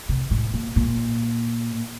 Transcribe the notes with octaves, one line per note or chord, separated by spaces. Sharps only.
C3
A2
A#2
A#2